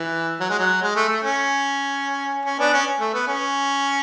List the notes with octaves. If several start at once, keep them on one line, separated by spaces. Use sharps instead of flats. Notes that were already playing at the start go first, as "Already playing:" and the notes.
Already playing: E3
F#3
G#3
F#3
G#3
A3
A3
C#4
C#4
B3 D4
C#4
A3
B3
C#4